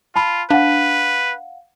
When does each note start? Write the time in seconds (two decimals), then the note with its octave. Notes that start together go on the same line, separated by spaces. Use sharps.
0.16 F4 A5 B5
0.50 D4 B4 F5 F#5